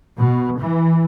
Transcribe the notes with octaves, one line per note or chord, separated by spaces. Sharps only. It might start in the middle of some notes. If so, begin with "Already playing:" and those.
B2
E3